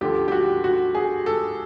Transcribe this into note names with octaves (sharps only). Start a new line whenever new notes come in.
D2 D3 F3 G4
G4
F#4
F#4
G#4
A4